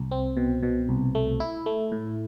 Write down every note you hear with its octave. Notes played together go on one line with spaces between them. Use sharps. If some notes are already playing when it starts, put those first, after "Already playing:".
Already playing: C2
C4
B2
B2
C2
A3
E4
A3
A2